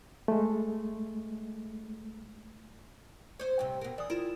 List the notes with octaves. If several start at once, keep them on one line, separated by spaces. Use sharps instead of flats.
G#3 A3
C5 C#5
G2 C3 G5
B2 A#4
E3 D5 D#6
E4 F4 A#4 E7